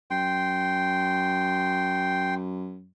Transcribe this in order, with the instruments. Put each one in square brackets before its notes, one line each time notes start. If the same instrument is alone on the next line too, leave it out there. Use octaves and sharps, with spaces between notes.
[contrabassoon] F#2 [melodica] G5 C6